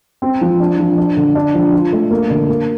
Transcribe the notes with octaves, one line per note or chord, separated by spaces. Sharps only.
C4
F3
D4
F3
D4
D3
D4
F3
F4
A3
A#3
D3
A#3